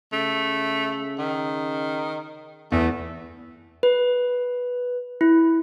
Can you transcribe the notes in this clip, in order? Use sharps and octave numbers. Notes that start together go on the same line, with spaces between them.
C#3 A3
D#3
E2 A3
B4
E4